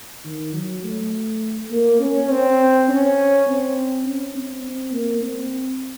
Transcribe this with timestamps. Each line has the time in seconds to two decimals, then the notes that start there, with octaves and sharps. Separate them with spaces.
0.24 D#3
0.53 F#3
0.83 A3
1.71 A#3
2.00 C#4
2.30 C4
2.89 C#4
3.47 C4
4.05 C#4
4.35 C4
4.64 C4
4.93 A#3
5.22 C4